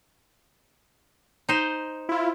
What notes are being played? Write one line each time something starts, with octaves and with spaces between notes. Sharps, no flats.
D#4 C5
E4 F4